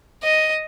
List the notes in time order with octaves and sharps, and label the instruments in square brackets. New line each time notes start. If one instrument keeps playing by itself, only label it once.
[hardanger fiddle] D#5